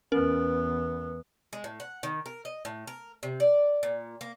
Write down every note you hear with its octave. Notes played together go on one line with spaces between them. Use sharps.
E2 B3 C#4 A#4
G#3
A2
F#5
D#3
A#4
D#5
A2
A#4
C3
D5
A#2
A#3